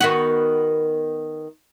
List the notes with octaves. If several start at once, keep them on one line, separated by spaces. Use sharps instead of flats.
D#3 B3 F#4